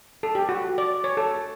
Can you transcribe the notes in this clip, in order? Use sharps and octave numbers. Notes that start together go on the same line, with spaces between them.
A4
G4
F#4
D5
C#5
A4